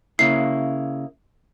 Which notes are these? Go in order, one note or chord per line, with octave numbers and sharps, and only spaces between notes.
C#3 A#3 E4 C7